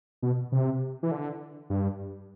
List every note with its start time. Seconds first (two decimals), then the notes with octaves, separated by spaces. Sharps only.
0.23 B2
0.52 C3
1.03 E3
1.12 D3
1.70 G2